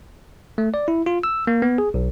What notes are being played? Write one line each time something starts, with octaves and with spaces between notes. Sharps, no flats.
A3
D5
E4
F4
E6
A#3
B3
G#4
B1